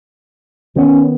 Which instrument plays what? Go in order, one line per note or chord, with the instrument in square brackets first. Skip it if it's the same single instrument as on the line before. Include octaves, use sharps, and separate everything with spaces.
[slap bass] D#3 B3 [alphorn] C#4